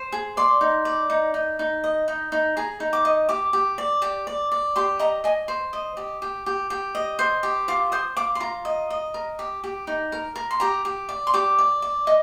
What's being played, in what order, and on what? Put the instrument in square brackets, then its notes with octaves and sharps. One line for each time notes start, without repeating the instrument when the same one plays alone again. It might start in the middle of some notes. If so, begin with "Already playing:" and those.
Already playing: [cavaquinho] C5
G#4
D5 C6
D#4
D5
D#4
D#4
D#4
D#5
D#4
D#4
G#4 A#5
D#4
D6
D#5
G4 D6
G4
D5
G4
D5
D5
G4 C6
D#5 A#5
D#5 G#5
C5
D#5
G4
G4
G4
G4
D#5
C5
G4
F4 D6
C5 D#6
F4 D6
C6
F4 A#5
D#5
D#5
A#4
G4
G4
D#4
A#4
A#4
C6
G4 A#5
G4
D5
C6
G4 D6
D5
D5
D#5